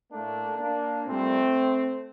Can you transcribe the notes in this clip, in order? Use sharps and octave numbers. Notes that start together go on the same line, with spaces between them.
A2 A3 A#3 D4
A#3 D4
A#2 G3 A3 C4